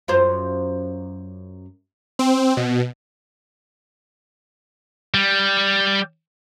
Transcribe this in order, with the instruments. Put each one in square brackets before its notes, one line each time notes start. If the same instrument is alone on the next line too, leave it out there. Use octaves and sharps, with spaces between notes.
[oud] F#2 F4 C5
[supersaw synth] C4
B2
[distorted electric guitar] G3